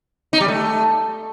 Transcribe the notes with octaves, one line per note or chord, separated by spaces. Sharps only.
D#4
G3
A3